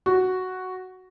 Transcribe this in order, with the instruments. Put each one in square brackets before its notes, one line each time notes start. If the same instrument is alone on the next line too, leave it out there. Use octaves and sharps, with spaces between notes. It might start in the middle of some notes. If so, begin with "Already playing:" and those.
[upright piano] F#4